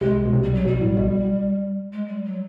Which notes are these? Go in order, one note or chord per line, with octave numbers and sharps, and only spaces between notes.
C2 C3 G#3
B2
C2 C3
G3
F#3
B1 B2 G3
A1 A2
B1 B2
G#3
G3
F#3